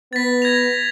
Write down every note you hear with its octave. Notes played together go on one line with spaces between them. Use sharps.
B3 A6 B6
G#6 A#6 F7